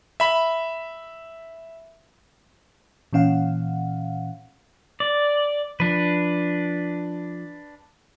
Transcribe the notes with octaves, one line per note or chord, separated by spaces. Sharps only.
E5 B5
A#2 E3 C#4 F5 F#5
D5
F3 D4 B4